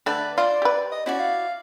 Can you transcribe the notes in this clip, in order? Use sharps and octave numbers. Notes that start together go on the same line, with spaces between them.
D3 A3 D4 B4 D5
F4 C5 D5 C6 D6
G4 B4
D#5
C#4 E4 F#4 D5
F5